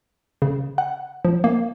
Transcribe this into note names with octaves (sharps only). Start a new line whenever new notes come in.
C#3
F#5
F3
A#3